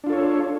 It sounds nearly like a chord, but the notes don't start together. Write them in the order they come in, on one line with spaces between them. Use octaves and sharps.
D4 F4 A4 C#5